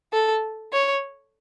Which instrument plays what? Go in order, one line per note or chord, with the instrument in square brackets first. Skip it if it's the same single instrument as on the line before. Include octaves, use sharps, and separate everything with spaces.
[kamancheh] A4
C#5